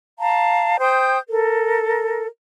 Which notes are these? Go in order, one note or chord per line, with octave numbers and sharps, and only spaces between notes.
F5 A5 A#5
C5 G5 D#6 G6
A4 A#4